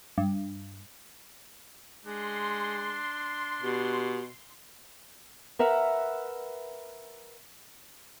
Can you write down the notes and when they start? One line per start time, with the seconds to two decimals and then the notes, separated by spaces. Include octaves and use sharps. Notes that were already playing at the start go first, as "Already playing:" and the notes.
0.18 G2
2.06 G#3 D4 C6
3.62 B2 G4
5.59 A#4 B4 E5 F#5